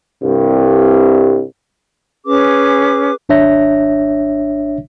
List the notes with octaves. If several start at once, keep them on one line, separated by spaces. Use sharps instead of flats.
C2 G2
C#4 G#4 B4 D6
G#1 D4 C#5 E5 A#6